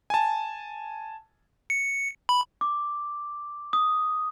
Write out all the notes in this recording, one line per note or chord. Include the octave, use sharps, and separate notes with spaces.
G#5 A5
C#7
B5
D6
D#6